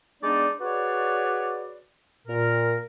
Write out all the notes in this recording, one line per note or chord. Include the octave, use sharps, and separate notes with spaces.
G#3 B3 D4 D#4 D5
F#4 G#4 B4 C#5 D5
A#2 A#4